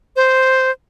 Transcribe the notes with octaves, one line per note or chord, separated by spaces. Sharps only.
C5